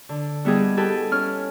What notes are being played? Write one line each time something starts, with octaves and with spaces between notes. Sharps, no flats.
D3
G3 B3 E4 G4 G#4 D#5
G4 A4 B4 G#5
C#4 F6